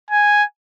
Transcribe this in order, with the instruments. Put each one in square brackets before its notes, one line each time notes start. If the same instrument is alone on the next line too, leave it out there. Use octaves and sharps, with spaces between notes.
[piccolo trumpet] G#5